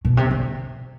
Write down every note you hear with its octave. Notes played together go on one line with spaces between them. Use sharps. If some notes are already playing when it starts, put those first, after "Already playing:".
B2
C3
D3